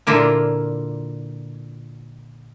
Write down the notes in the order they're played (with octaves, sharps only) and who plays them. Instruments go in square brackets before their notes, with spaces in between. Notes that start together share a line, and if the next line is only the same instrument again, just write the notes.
[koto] A#2 D3 A#3 E4 F4